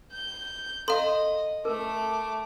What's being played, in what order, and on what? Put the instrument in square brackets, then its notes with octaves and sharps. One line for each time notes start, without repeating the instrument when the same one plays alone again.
[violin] G6
[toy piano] A4 A#5 [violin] D#5 [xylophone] F5 C6
[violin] A3 D6 [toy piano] A#4